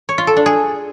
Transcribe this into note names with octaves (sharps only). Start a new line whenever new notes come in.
C#5
F4
A4
D4
G#4